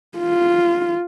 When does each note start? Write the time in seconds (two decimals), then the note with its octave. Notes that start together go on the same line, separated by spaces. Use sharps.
0.18 F4